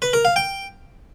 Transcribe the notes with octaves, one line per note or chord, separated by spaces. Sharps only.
B4
A#4
F5
G5